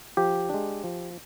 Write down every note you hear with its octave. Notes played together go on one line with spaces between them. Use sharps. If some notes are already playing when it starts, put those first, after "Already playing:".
F3 G4
G#3 D4
F3